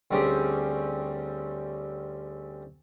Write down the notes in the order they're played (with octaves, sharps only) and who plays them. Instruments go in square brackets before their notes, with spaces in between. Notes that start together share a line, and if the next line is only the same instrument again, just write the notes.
[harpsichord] D2 G3 C4 C#4 G4 G#4